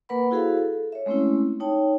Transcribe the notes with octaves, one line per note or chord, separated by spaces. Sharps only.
A#3 A#4 B4 F#5 B5
E4 F#4 G#4 A4 C5 F5
A4
C#5 E5
G#3 A3 C4 C#4 E4
D#4 C#5 G5 A5